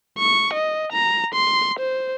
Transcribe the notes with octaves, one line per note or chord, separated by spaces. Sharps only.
C#6
D#5
A#5
C6
C5